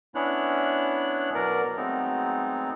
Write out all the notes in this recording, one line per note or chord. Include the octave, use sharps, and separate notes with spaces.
B3 C#4 D4 E4 C#5 F#6
B2 F#3 A#4 D5
F#3 G#3 A3 B3 C4 D#4